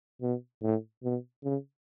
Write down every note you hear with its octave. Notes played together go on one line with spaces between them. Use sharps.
B2
A2
B2
C#3